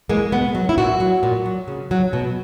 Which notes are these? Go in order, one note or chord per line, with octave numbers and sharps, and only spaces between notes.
E3 G#3 A#3
B2 B3
F#3
E4
A#2 F#4
F#3
A#2
F#3
C#3
F#3
B2